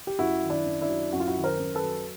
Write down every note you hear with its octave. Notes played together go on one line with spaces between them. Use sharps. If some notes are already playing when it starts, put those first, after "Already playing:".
G4
F#2 E4 F#4
D#3
D4 E4
F#2
D4 E4
F#3
F#2 F#4
F4
E4 F#4
D#3
A#4 C5
F#2
A4 B4
F#3